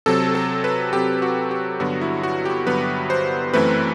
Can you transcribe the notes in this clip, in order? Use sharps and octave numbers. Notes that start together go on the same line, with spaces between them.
C3 F#3 C4 A4
A4
B4
C3 F#3 C4 G4
F#4
G4
G2 D3 F#3 B3 F#4
E4
F#4
G4
G2 D3 F#3 B3 B4
C5
F#2 E3 A3 C4 B4